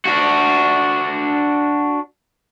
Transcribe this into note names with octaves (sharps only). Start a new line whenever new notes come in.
D4 F#4